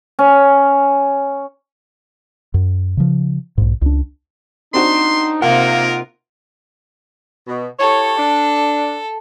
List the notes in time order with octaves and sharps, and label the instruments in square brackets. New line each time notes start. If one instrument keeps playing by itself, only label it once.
[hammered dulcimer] C#4
[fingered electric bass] F#2
C#3 F3
B1 G#2
C#2 D4
[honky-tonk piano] C4 D4 F#4 [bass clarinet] D#4 [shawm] C6
[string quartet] C3 A#3 D#4 [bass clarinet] F4 [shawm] A#4 [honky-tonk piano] F#5
[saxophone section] B2
[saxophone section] E4 G4 C#5 [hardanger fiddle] A4
[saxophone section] D4